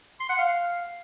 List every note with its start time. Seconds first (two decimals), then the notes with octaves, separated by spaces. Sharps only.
0.20 C6
0.29 F#5
0.39 F5